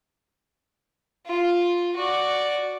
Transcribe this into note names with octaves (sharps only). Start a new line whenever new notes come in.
F4
F#4 D5